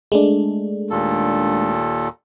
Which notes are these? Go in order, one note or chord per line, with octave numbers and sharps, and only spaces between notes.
G#3 A3 D4
D#2 A#2 A4